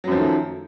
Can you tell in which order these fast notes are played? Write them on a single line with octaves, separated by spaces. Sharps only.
F#3 F#2 F3 D#3 A3